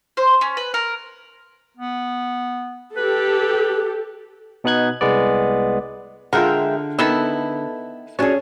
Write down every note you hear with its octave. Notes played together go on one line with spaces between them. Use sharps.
C5
C#4
B4
A#4
B3
G4 A4 B4
B2 B3 D#4 F#6 G#6
C2 G#3 B3 D5
D3 G#3 F4 A#4 E5 F#5 G5
D#3 B3 E4 A4 E6
F#3 C#4 D4 G#4 A4 C#5